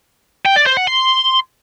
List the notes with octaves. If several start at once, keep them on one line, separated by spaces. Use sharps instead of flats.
G5
D5
C5
F#5
C6